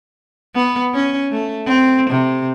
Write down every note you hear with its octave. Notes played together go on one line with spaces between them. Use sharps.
B3
C#4
A3
C4
C3